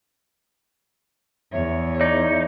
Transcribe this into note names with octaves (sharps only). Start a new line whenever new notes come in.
E2 C#5 E5
D#4 D5